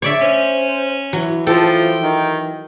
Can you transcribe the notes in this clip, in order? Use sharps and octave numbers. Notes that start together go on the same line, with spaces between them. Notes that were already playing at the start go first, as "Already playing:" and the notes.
D3 C#5 D5 E5
C#4 C5
E3 F#3
F3 A4 G5
D#3